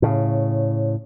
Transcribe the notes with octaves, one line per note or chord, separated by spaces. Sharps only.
A2 C#3